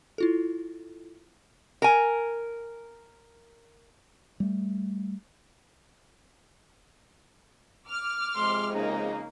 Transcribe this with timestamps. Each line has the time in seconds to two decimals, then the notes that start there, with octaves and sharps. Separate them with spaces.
0.18 E4 F4 A4
1.82 A#4 G#5
4.40 G3 A3
7.88 D6 F6
8.37 F2 C3 G#3 C6
8.74 C#3 A#3 D#4